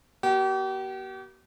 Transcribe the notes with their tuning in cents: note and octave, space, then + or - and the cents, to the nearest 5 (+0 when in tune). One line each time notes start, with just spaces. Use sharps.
A#3 +40 G4 -40